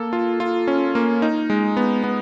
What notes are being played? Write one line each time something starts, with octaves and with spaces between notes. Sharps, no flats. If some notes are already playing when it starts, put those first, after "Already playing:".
Already playing: A#3 A4
F4
F4
C#4
A#3
D#4
G#3
B3
B3